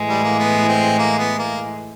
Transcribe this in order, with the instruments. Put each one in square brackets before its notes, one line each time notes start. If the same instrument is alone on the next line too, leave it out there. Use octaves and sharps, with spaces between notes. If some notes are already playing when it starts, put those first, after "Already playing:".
Already playing: [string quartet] A2 E3 G#3
[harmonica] G3
A#3
B3
C4
A#3
B3
A#3